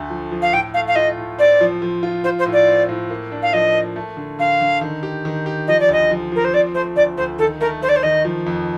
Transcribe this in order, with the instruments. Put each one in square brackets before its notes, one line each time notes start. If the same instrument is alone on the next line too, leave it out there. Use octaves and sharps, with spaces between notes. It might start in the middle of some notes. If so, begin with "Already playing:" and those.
Already playing: [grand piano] D2 A3
F3
F3
[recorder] F5
[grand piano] A2 [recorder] G5
[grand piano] A3 [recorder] F5
[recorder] F5
[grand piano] F4 [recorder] D#5
[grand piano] A2
[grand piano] C4 [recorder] D5
[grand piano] F3
F3
F4
[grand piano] F4 [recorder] C5
[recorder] C5
[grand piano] A2
[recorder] D5
[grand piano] C4
A2
A#3
D4
[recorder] F5
[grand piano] F3 [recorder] D#5
[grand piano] A#3
A3
D3
[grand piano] D3 [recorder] F5
[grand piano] D3
D#3
G4
D#3
G4
[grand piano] F3 [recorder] D#5
[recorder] D5
[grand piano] D2 [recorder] D#5
[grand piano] F3
[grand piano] F3 [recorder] A#4
[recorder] C5
[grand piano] C4 [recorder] D5
[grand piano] A3 [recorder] C5
[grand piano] D2 [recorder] D5
[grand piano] D2 [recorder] C5
[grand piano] D#3 [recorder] A4
[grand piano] A3 [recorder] A#4
[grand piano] A3 [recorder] C5
[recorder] D5
C5
[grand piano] D#3 [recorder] D#5
[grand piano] F3
F2